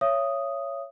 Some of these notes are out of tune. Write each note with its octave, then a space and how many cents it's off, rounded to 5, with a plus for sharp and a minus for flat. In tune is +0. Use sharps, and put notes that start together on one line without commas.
C#5 +0 E5 +35 D#6 +0